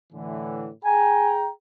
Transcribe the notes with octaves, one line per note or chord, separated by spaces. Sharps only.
A2 D3 E3
G#4 G5 G#5 A#5